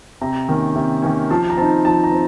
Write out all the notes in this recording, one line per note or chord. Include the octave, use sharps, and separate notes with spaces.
C3 A#5
D#3 A#3 C#4
C3
D#3 A#3 C#4
F3 A5
A#5
C4 D#4 A5
F3 A5
A#5
C4